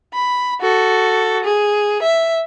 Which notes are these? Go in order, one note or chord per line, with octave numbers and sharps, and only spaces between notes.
B5
F#4 A4
G#4
E5